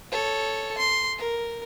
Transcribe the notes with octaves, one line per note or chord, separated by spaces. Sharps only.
A4 C#5
C6
A#4